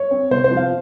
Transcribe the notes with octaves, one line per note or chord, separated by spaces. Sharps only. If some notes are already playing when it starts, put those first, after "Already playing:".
Already playing: C#5
C4
C3 C5
C5
F3
F5